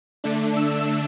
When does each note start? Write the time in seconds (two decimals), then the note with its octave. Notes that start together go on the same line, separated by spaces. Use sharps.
0.24 D3 A3 D4
0.56 E6